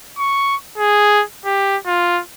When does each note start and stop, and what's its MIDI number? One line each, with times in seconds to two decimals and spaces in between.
0.19 0.56 85
0.78 1.23 68
1.45 1.77 67
1.87 2.21 65